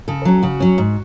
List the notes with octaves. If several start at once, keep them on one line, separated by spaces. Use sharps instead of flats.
C#3 A4
F#3 C#4
C#3 F#4
F#3 C#4
G#2